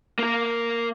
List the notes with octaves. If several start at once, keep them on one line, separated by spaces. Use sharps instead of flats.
A#3 A#4